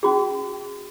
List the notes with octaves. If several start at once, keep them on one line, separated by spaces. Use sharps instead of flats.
C#4 F#4 G#4